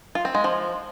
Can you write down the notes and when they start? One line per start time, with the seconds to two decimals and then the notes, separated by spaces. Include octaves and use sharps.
0.15 F4
0.25 C4
0.35 G#3
0.44 F3